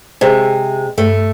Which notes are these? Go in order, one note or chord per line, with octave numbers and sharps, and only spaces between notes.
C3 G#3 C5
G2 A3